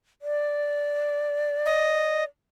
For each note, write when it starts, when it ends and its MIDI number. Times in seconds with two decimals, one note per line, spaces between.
0.22 2.24 74
1.66 2.24 75